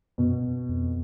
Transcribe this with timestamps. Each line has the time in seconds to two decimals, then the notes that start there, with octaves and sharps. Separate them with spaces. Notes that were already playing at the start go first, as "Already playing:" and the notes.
0.18 F#2 B2
0.69 F2